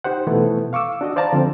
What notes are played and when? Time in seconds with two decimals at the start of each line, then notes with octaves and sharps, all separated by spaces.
0.04 D#4 G4 C5 F#5
0.27 B2 E3 A3 B3 E4 A4
0.73 F5 C#6 D6 E6
1.01 D4 F#4 D#5
1.16 C5 D5 F5 A5 A#5
1.33 D3 F3 C4